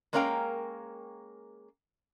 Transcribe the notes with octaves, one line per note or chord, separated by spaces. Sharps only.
G#3 A#3 C#4 A#4 F5 G5